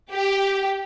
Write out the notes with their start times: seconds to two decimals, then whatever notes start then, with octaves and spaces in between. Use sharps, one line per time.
0.12 G4